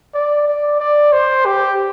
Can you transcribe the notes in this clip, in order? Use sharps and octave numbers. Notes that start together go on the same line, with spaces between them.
D5
D5
D5
C5
G4